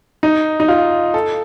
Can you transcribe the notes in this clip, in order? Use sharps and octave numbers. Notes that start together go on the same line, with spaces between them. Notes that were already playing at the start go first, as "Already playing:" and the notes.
D#4
D#4
F4
A4